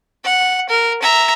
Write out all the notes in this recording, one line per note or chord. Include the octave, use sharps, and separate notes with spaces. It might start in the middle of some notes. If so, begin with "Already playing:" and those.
F#5
A#4
E5 A#5